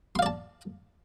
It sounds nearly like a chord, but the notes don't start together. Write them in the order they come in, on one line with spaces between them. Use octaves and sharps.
C6 F5 D5 A5